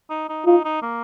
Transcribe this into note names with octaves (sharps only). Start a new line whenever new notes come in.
D#4
D#4
D#4 F4
D#4
A#3